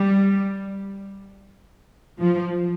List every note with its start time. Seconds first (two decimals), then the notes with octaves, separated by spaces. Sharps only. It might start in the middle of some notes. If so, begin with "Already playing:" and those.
Already playing: G3
2.20 F3